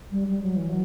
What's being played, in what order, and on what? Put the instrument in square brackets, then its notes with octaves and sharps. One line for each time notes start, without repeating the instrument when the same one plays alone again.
[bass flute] G3
G3
F#3
E3
F#3